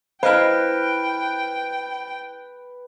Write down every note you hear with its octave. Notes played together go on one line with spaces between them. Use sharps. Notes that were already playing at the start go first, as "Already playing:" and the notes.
E4 B4 C5 D#5 F5 G5 F6